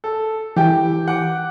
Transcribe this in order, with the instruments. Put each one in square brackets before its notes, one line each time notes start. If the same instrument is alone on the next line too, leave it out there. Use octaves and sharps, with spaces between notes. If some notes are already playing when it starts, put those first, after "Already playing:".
[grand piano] A4
[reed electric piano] E3 [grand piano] G4 G5
[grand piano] F#5 D6